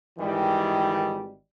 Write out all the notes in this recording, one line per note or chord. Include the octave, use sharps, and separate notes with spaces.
G#1 D#3 E3 G3